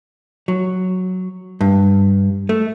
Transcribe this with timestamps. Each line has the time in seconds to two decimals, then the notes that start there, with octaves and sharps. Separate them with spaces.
0.48 F#3
1.61 G2
2.49 A3